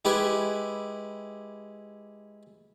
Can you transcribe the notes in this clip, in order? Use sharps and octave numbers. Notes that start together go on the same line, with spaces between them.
G#3 E4 G4 B4 G#5